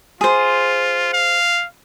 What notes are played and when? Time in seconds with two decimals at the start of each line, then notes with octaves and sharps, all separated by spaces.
0.21 F4 G#4 C5
1.13 F5